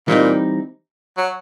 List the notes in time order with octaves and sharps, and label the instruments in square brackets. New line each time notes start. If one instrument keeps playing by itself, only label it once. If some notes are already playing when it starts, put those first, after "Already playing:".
[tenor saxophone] A#2 [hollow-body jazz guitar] E3 G3 C4 D#4
[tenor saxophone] F#3